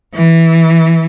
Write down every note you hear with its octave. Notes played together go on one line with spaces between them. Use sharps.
E3